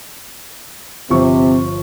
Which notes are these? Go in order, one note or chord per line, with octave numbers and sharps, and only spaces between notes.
G1 C3 F3 C4 C#6